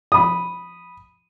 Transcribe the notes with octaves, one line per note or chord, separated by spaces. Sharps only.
B5 D#6